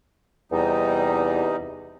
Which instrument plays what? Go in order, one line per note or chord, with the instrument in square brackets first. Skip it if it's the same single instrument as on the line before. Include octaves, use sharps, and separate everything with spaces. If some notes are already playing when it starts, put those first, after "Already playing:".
[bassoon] E2 [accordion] C3 G3 D#4